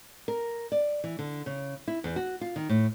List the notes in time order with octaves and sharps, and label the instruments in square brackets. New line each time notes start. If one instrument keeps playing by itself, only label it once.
[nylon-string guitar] A#4
D5
E3
D3
C#3
E4
E2
F#4
F4
D#3
A2